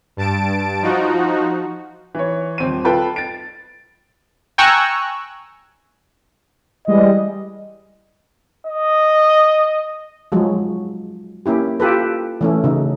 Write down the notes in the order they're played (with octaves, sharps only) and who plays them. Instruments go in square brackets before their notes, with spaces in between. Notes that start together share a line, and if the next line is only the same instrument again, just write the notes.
[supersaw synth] G2 A5 D7
F3 D#4 F#4
[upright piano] E3 C#5
D#1 C4 D#7
F4 A4 B4 G5 A5 B5
A6 D7
[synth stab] G5 G#5 A#5 C#6 E6 F#6
[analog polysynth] E3 G3 G#3 [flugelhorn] D#5
[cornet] D#5
[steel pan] F3 F#3 G#3
A#3 C#4 E4 G4
F4 G4 A4 B4
E3 A3 C#4
C#3 D#4